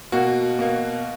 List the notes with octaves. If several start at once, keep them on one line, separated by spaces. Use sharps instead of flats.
B2 A#3 F#4
B2 A#3